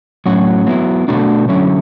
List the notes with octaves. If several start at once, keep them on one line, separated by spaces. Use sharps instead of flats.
A2 F#3 C#4 F#4
F#3 B3 E4
B2 A3 D4 F#4
D3 F#3 C#4 E4